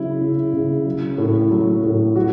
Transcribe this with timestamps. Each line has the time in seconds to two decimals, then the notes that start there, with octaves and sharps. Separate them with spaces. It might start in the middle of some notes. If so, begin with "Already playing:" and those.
Already playing: C#3 F#3 E4
0.20 C#3
0.53 C#3
0.86 F#3
1.18 A2
1.51 F#3
1.83 A2
2.16 F#3 F#4